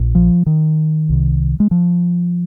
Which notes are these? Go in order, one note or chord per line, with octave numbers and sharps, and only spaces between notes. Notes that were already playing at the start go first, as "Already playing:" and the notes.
Already playing: A#1 A#2
F3
D#3
C2 C3
G#3
F3